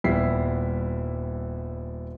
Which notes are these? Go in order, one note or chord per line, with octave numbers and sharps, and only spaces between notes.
D#1 G3 B3 E4 B6 C7